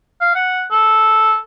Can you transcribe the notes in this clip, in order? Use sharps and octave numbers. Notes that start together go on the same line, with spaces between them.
F5
F#5
A4